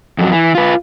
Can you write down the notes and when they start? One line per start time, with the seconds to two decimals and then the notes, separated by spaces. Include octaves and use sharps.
0.19 F2 F#3
0.32 E3
0.55 F4 B4